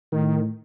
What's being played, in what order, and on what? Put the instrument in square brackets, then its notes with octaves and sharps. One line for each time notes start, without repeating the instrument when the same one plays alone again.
[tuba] A2 [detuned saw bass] D#3